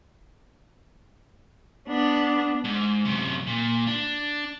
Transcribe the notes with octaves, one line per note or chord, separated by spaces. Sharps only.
B3 D4
G#2
F#2 C3
A#2
D4